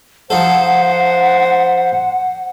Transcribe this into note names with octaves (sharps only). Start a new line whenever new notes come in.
F3 D#4 A4 C5 F#5